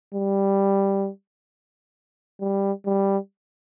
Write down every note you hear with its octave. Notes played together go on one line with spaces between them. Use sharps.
G3
G3
G3